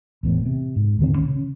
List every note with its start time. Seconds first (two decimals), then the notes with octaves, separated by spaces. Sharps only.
0.23 E1 E2 A2
0.46 C3
0.76 G#2
0.99 D#1 D3 D#3 C4
1.15 C2 C#4
1.26 C#3